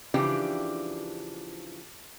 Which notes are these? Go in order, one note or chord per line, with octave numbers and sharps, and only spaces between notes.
C#3 E3 F3 D4 G4